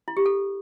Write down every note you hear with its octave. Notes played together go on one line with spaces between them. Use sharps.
E4
G4
A4